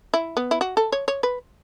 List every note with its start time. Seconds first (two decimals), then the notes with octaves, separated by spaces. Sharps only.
0.14 E4
0.37 B3
0.51 E4
0.61 F#4
0.77 A4
0.92 C#5
1.08 C#5
1.23 B4